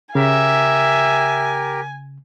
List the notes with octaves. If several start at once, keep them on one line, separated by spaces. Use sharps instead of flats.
C#3 G4 A#4 E5 G#5